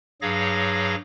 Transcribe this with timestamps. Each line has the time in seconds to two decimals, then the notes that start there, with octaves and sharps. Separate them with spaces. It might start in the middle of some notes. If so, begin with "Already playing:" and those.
0.22 G2 F#3 G#4 C#5 F5 A#6